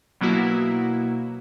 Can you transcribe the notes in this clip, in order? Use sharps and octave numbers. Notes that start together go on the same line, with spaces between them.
B2 F#3 A#3 E4 F#4